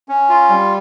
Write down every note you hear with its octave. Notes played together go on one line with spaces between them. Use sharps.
C#4
F4
G3